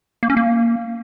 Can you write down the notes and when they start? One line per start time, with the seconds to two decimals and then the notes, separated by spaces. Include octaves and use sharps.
0.23 A#3
0.30 C#4
0.37 A#3